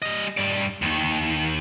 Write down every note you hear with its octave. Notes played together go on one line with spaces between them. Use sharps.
G3 D#5
G2 D5
D#2 D#3